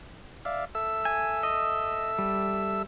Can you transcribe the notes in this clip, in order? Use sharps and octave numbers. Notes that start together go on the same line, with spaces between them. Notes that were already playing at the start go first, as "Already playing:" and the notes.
D5 E5 F5
A4 E5 E6
G#5
D#5
G3